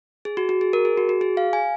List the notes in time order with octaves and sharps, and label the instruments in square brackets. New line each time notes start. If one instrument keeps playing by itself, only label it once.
[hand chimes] G#4
F#4
F#4
G#4
A#4
G#4
F#4
F#4
G#4
F5
G#5